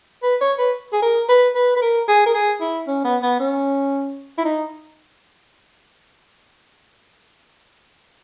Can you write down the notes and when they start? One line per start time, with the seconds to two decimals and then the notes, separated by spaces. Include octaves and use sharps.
0.23 B4
0.41 C#5
0.59 B4
0.93 G#4
1.02 A#4
1.29 B4
1.55 B4
1.76 B4
1.81 A#4
2.08 G#4
2.26 A#4
2.34 G#4
2.61 E4
2.87 C#4
3.04 B3
3.22 B3
3.40 C#4
4.38 E4
4.45 D#4